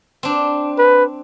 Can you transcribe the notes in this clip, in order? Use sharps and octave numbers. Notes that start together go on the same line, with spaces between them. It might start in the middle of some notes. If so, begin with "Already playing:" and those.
C4 D4
B4